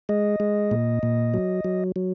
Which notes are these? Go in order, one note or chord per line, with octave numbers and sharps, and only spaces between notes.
G#3 D#5
G#3
A#2
A#2
F#3
F#3
F#3